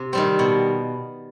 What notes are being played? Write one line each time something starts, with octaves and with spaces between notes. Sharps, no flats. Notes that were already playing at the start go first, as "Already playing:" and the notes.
Already playing: C3
D#3 G3 C4
B2